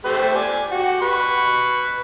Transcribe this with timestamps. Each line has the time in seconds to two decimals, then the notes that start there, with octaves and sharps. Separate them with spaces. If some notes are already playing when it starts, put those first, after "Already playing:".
0.05 A3 G4 C5
0.35 D5 G#5
0.72 F#4 G4
1.02 B4 B5 C#6